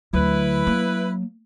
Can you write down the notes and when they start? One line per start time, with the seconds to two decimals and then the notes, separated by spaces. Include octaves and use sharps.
0.13 D2 F#3 E4 B4
0.67 A#3